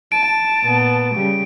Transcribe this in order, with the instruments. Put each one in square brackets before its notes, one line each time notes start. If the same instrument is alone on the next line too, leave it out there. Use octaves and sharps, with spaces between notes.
[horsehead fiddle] A5 [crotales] D7
[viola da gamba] A#2 B3
C#3 G3